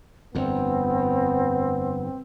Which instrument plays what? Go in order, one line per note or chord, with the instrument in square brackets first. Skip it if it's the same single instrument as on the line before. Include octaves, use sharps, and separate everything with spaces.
[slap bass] G1 F2 [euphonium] B3 [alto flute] C4